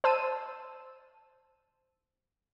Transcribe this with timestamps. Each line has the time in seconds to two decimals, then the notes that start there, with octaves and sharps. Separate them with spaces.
0.04 C5 A5 E6 D#7